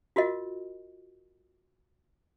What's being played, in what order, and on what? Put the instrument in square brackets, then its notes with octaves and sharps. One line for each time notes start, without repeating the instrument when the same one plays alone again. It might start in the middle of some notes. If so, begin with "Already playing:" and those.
[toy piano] F4 F#4 A#4 D#5